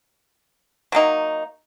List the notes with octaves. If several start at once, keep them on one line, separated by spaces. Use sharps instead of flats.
F#3 A#3 D#4